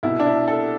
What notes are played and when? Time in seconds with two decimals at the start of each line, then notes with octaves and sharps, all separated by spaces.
0.03 C2 B2 E4
0.20 D4
0.26 E4
0.48 A4